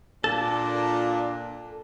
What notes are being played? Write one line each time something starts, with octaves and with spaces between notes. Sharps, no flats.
A#2 D4 A4 A5